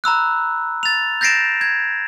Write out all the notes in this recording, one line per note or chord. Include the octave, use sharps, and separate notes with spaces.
A#5 B5 E6 F#6
A6 F7
G6 A6 A#6 C7 D7 E7
G#6